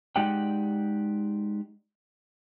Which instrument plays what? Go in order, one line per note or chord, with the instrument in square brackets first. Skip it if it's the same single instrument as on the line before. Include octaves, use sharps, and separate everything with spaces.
[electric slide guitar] G#3 D#4 G4 D5 F#5 G5